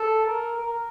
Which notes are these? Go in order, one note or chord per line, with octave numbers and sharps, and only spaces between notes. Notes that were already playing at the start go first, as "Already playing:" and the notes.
Already playing: A4
A#4
A#4